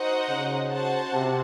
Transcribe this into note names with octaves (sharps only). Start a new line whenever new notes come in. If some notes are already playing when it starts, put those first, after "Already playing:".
Already playing: D#4 F#4 C5 D#5 F#5
C#3
F#4 C5 F#5 A5
C3